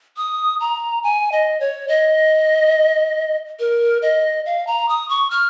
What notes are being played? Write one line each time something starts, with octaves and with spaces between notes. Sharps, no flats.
D#6
A#5
G#5
D#5
C#5
D#5
A#4
D#5
F5
A#5
D#6
C#6
F6